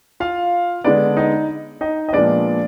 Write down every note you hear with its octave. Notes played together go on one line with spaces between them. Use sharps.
F4 F5
D3 G#3 B3 D4 D5
D#4 D#5
D#4 D#5
D#5
A#2 F3 G#3 B3 D4 D5